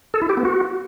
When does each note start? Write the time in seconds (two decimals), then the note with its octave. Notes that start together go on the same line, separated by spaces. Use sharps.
0.14 A4
0.22 E4
0.29 G4
0.37 B3
0.45 F#4